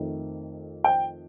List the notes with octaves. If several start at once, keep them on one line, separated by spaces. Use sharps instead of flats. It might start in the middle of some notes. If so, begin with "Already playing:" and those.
Already playing: F2 D#3 A3
G5